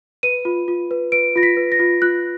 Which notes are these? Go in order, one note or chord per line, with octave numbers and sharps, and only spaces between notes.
B4 D#7
F4
F4
B4
B4 D7
F4 A#6
B6
B4
A#6
F4
F4 F#6